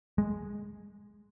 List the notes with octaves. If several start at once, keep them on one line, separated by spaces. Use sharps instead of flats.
G#3